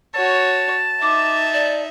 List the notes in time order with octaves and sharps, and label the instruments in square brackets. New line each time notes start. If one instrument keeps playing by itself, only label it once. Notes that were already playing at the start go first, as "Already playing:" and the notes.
[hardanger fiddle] F#4 C#5 [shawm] A5
[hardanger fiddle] D#4 E5 [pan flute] D6
[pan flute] D5